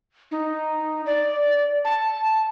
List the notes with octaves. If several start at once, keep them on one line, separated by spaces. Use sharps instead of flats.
D#4
D5
A5